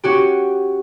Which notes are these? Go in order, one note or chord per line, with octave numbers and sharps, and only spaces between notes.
C#4 F#4 G4